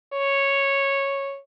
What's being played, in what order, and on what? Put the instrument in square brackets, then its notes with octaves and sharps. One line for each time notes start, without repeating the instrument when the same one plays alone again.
[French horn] C#5